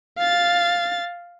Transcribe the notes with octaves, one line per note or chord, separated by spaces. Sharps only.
F5 A6